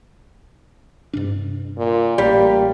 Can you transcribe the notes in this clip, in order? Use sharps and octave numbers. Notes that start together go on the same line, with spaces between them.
G2 C3 D4
A#2
A1 G3 A#3